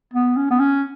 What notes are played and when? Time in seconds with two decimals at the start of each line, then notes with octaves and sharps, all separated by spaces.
0.14 B3
0.37 C#4
0.50 B3
0.60 C#4